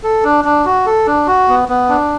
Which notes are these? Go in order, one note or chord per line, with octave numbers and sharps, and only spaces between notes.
A4
D4
D4
F#4
A4
D4
F#4
B3
B3
D4